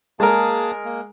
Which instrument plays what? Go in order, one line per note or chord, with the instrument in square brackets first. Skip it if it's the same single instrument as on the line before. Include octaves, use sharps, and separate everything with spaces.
[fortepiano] G#3 A#4 [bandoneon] A#3 G#4 A5
[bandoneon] A#3